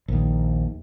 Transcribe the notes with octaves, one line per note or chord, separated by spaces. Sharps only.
A#1 D#2